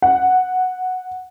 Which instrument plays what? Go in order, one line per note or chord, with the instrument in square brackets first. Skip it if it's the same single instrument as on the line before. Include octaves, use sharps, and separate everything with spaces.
[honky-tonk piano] F#5